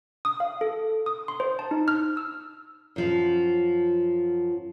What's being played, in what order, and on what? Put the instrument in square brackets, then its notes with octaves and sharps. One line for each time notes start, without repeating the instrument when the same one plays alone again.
[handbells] D#6
F5
A4
D#6
C6
C5
A5
D#4
F6
E6
[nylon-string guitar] F#2 F3